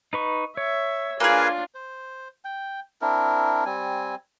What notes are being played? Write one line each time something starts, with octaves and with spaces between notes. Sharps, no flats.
D#4 B4 C#6
C#5 E5
A#3 D4 F4 G#4 B4 F5 G#5
C5
G5
C4 D4 E4 A#4
G3 C4 G#5